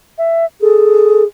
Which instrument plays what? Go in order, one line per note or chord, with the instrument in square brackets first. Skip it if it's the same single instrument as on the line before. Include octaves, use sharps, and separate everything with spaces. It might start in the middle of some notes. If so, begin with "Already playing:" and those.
[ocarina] E5
[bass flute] G#4 [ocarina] A4